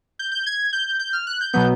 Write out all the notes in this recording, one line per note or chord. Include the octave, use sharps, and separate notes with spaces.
G6
G6
G#6
G6
G6
F6
F#6
G6
B2 F#3 B3 G6